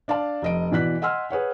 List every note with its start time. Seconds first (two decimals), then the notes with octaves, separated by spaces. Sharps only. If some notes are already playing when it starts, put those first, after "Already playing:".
0.08 D4 D5 F5 A5
0.42 F1 D#5 D7
0.71 B2 E3 D5 F#6 B6
1.02 D#5 F#5 G#5 C6 E6 F6
1.31 G#4 B4 C#5 F#5